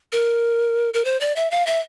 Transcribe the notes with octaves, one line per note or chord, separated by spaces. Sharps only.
A#4
A#4
C5
D5
E5
F5
E5